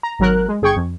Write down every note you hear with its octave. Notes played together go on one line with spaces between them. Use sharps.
A#5
G#1 F#3 A#4 F#6
G#3
G1 G#4 G5 C#6 G#6
F2